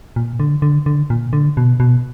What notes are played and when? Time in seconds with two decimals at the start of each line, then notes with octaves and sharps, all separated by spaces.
0.16 A#2
0.40 D3
0.62 D3
0.86 D3
1.10 A#2
1.33 D3
1.57 B2
1.80 B2